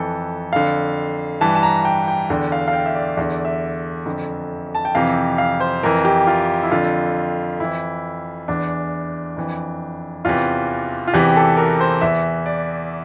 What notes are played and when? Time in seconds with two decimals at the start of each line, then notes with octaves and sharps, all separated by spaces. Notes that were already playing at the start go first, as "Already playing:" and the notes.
Already playing: F2 E3 A4
0.53 F2 D3 F5
1.41 G2 E3 A5
1.55 A5
1.63 A#5
1.85 G5
2.08 G5
2.30 E2 D3 G5
2.52 F5
2.68 F5
2.73 G5
2.86 E5
2.95 D5
3.17 E2 D3 E5
3.32 D5
3.45 E5
4.06 F2 D3
4.75 A5
4.85 G5
4.95 F2 C3 E3 F5
5.38 F5
5.60 C5
5.83 F2 E3 A#4
6.05 G4
6.27 F4
6.63 E4
6.71 F2 D3 F4
7.59 F2 E3 E4
8.48 E2 E3 D4
9.36 F2 E3
10.25 E2 C3 E3 F4
11.07 F4
11.13 E2 C3 E3 G4
11.36 A4
11.57 A#4
11.80 C5
12.01 E2 E3 E5
12.46 D5